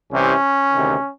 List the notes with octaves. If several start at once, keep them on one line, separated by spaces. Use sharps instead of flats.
C2 C3 E3 C#4
D2 C3 D#3